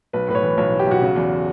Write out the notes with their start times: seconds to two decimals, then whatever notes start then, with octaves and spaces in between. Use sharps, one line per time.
0.13 B1 B4
0.28 A2 B4
0.35 C#5
0.43 E3
0.57 B1 C#5
0.72 E3
0.79 G4
0.87 B1 F#4
1.02 C#3
1.16 E2